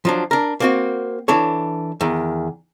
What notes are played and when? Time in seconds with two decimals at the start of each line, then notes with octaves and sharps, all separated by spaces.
0.05 F3 F#3 D4
0.31 D4 A#4
0.60 A#3 C4 F#4
1.28 E3 D4 A4 C#5
2.01 E2 D#3